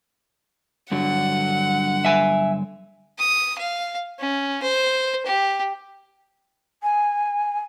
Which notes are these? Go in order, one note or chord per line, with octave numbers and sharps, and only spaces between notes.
G2 D3 F#3 F#5
E5 G#5
D#6
F5
C#4
C5
G4
G#5